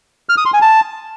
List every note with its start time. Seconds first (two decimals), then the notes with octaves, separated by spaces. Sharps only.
0.29 F6
0.37 D#6
0.45 C6
0.54 G#5
0.62 A5